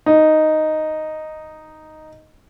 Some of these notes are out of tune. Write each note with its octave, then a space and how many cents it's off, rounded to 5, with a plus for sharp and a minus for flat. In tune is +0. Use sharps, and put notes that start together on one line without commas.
D#4 +0